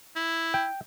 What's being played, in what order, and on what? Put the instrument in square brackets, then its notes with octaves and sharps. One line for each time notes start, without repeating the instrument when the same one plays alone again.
[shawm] E4
[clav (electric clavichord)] G5